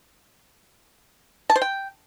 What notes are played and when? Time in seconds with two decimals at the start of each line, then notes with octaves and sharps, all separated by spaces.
1.50 A5
1.56 C5
1.62 G5